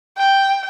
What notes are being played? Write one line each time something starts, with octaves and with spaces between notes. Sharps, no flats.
G5